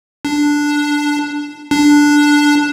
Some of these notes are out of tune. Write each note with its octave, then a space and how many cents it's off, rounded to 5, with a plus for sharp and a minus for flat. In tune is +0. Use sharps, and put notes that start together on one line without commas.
D4 +0
D4 +0